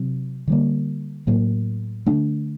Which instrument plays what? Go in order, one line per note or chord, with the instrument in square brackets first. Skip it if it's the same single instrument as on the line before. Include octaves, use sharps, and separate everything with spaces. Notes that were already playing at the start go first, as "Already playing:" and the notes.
Already playing: [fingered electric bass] C3 F#3 C4
D3 G3 A#3
A2 F#3 A#3
D3 A3 D4